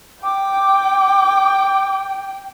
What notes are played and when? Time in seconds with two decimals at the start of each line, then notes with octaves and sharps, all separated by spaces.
0.24 G5 D6